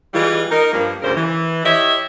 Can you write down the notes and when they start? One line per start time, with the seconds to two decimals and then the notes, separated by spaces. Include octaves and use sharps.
0.13 E3 G3 G#3 F4
0.51 D#4 A#4
0.72 G2 F3 A#3
1.02 D2 G2 C#3 A#4 C5
1.15 E3
1.64 E4 G4 C#5 D#5 E5